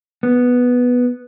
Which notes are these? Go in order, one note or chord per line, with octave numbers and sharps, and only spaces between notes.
B3